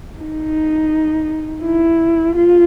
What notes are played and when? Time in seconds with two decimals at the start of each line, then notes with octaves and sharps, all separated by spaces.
0.20 D#4
1.63 E4
2.36 F4